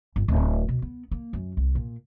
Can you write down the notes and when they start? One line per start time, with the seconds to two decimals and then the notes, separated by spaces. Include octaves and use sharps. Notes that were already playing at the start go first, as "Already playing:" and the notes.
0.16 G1
0.28 D1
0.69 B2
0.82 B3
1.11 A#3
1.33 F#2
1.57 C2
1.75 A#2